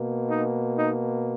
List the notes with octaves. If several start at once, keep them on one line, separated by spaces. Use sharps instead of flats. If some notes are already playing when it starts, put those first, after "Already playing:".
Already playing: B2 A#3
D#4
D#4